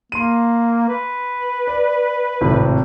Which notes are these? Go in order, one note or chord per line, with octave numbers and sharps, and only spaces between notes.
A#3 C6 D#7
B4
D5
G#1 A2 C3